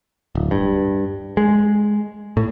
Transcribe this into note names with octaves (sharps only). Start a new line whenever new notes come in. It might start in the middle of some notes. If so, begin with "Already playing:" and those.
D1
G2
G#3
A2